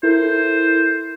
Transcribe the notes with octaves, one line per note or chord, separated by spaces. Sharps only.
E4 A4 A#4 C5